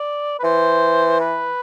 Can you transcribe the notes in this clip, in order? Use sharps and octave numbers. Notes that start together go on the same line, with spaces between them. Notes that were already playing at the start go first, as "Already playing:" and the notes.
Already playing: D5
B4
E3 C5
B4